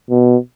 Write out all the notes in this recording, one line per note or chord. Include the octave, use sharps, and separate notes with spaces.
B2